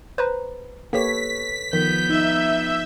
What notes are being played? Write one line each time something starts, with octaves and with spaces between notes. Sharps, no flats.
B4 C5 A#5
A#3 G4 A4 B4 C#5 B6
D#3 F3 B3 G6
D#4 E5